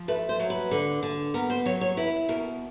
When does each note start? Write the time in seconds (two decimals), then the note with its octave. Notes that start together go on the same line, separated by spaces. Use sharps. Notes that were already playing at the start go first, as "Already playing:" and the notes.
Already playing: F3
0.08 A3 B4
0.29 C5
0.40 F#3
0.50 B4
0.71 D3
1.03 D3
1.34 B3 A#4
1.50 C5
1.65 F#3 C#5
1.81 C#5
1.97 E4 B4
2.29 B2 A#4